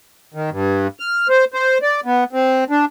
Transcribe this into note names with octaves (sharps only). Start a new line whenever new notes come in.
D#3
G2
F6
C5
C5
D5
B3
C4
D4